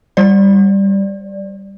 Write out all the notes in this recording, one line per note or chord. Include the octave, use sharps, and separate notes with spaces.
G3 D5